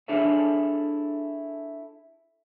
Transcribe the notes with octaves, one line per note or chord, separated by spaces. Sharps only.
D4 E4 G#4 A4 C#5 E5